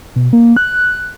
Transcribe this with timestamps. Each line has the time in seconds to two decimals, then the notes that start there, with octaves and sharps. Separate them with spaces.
0.16 B2
0.33 A#3
0.57 F#6